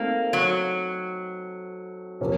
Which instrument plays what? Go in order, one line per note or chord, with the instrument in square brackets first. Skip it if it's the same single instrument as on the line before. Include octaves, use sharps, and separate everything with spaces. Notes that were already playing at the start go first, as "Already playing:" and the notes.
Already playing: [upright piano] A3 C4 D#4 F#4 A4 [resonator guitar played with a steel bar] A#3
[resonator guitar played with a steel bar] F#3
[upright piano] C3 F3 A#3 C#4